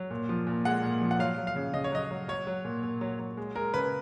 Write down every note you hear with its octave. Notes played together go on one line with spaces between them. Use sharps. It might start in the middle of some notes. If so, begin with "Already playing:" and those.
Already playing: F#3
A#2
F3
A#2
G#3 F#5
A#2
F3
F#5
F#3 F5
F#3
F5
C#3
C#3 D#5
C#5
F#3 D#5
F#3
F#3 C#5
F#3
A#2
A#2
F#3
F#3
G#3
G#3 A#4
C#3 B4